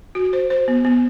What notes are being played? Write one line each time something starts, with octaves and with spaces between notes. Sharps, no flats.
F#4
C5
C5
B3
B3